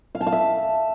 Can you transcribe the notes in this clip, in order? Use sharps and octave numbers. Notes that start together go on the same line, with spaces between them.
F5
A5
F5
E5